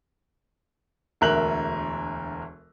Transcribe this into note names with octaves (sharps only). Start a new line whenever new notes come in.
E1 D2 A#4 E5 F#6 F#7